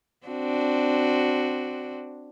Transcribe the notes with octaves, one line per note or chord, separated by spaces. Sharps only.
C4 D4 F#4